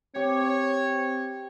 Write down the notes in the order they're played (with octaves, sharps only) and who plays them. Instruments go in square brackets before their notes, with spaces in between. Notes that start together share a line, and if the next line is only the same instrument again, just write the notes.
[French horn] C4 [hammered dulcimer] G4 [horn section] C#5